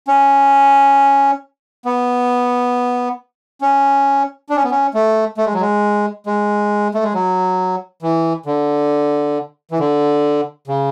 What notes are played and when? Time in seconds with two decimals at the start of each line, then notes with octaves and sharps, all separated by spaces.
0.08 C#4
1.85 B3
3.61 C#4
4.49 D4
4.56 C#4
4.64 B3
4.71 C#4
4.94 A3
5.37 A3
5.46 G#3
5.54 F#3
5.61 G#3
6.26 G#3
6.94 A3
7.03 G#3
7.14 F#3
8.02 E3
8.46 D3
9.71 E3
9.79 D3
10.68 C#3